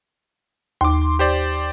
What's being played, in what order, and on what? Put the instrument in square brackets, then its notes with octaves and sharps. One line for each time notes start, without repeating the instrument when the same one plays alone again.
[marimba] D#2 [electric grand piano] C6 D6
[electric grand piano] G4 C5 D5